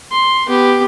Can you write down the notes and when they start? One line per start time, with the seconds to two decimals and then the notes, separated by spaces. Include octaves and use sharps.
0.12 C6
0.47 B3 G4